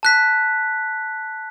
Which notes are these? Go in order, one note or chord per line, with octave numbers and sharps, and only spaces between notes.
A5 F#6 B6